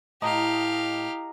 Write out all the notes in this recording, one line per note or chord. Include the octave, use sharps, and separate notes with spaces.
A2 G4 D#5 F5 A#5